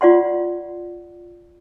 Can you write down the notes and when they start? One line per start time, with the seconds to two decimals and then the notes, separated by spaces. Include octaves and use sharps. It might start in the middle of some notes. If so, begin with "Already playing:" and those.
0.01 F4 D5 F#5 C6